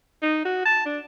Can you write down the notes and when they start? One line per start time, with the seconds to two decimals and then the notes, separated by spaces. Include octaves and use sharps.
0.22 D#4
0.45 F#4
0.65 A5
0.85 D4